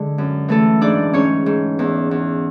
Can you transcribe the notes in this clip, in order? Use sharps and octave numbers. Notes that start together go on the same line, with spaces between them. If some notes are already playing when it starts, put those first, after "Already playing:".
Already playing: D3 G#3 G#4
F#2
E3 A3 A4
G#2 D4 D5
G#2 C#4 C#5
G#2
E2
E2